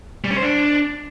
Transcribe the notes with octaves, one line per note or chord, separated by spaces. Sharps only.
G3
C#4
C5
D4